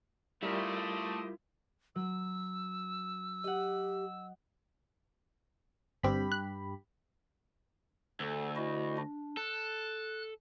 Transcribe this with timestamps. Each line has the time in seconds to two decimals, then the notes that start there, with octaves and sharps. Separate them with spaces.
0.43 G3 A3 E4 F4 G4 A#4 C5 D#5
1.96 F#3 E6
3.44 G4 D#5 F#5
6.03 G1 G2 C4 G4 B5
6.32 F#6
8.20 D2 A4
8.56 E4 F#4 D#5
8.98 D4
9.37 A4 F#6